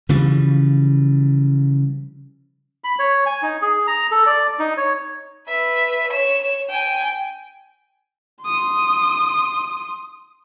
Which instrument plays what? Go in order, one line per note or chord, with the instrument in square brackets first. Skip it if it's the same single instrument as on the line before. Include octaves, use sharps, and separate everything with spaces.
[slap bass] C#3 E3 F3 G3
[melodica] B5
C#5
G#5
D#4
G#4
A#5
A4
D5
D#4
C#5
[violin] B4 E5
C#5 E7
G5 G#5
[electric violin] C6 D#6